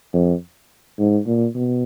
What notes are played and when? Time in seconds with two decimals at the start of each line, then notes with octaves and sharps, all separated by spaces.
0.14 F2
0.99 G#2
1.27 A#2
1.55 B2